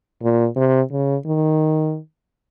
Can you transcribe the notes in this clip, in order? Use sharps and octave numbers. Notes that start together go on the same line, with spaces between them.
A#2
C3
C#3
D#3